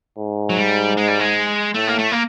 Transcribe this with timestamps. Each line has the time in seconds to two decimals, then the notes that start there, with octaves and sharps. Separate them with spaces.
0.18 G#2
0.50 F#3
0.57 G3
0.97 G#3
1.08 G3
1.19 G#3
1.75 A2 A3
1.88 A#3
1.99 A3
2.11 A#3